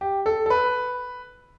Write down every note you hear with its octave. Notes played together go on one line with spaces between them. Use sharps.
G4
A4
A4
B4